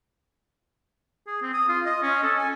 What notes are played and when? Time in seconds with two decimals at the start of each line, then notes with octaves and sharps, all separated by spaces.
1.27 G#4
1.42 C4
1.54 D#6
1.69 F4
1.86 D#5
2.02 C#4
2.23 A4
2.38 G#5